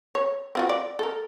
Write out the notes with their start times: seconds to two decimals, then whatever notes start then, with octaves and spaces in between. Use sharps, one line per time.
0.15 C#5
0.55 C4 F4 F#4
0.69 D5
0.99 A4 A#4